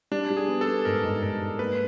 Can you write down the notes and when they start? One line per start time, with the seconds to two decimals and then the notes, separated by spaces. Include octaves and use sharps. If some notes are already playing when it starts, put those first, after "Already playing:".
0.11 G3 D4
0.30 G3
0.37 G#4
0.48 B3
0.61 A4
0.67 B3
0.85 G#2 A#4
1.04 G#2
1.23 G#2 A#4
1.41 G#2
1.59 A#3 B4